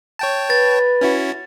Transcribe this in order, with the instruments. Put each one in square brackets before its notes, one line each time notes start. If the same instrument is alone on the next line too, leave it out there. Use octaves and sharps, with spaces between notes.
[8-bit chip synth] C#5 G5 A5
[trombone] B4 [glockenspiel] A6
[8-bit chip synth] C#4 E4 F#4